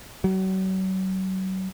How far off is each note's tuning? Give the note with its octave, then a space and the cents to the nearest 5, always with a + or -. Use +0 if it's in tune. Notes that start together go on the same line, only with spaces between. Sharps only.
F#3 +35